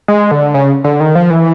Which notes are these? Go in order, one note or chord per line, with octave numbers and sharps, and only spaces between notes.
G#3
D3
C#3
D3
D#3
F3
E3